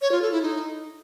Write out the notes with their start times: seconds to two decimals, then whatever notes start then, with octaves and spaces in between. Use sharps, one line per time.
0.01 C#5
0.12 F4
0.22 A4
0.32 E4
0.42 D#4